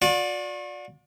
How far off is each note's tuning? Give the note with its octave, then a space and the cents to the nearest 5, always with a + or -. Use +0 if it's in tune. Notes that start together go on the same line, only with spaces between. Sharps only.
F#4 -45 D5 +0